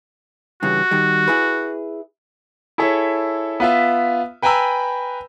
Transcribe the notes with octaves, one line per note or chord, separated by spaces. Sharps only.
G2 C#3 E3 F#4
D#3 G3
E4 G#4 B4
E4 G#4 A4 C#5 E5
B3 F4 E5
B4 G5 G#5 A#5 B5 E6